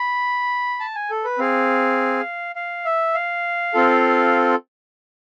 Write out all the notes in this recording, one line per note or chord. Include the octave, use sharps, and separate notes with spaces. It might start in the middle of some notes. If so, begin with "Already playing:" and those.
Already playing: B5
A5
G#5
A4
B4
C4 G#4 F5
F5
E5
F5
C4 F4 A4